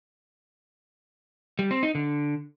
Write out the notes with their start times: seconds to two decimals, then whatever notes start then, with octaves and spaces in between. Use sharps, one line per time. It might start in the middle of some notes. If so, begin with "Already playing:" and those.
1.59 G3
1.71 C4
1.83 D#4
1.95 D3